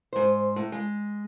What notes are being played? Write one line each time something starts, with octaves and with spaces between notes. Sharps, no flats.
G#2 C5
A2
G#3